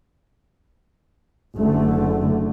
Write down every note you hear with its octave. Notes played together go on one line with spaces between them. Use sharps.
F#1 D3 A3